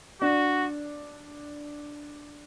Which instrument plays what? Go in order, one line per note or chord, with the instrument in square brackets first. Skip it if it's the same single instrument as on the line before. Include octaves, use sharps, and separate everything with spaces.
[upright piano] D4 [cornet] F#4